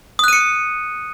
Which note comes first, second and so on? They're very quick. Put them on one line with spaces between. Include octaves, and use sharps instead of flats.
D#6 F#6 D#7 C#7